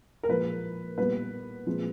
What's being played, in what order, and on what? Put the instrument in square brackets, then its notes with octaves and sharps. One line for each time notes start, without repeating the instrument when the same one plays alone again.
[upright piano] A#4
A#2 F3 G#3 B4
A#2 G3 B3 B4
A#2 F3 G#3 C4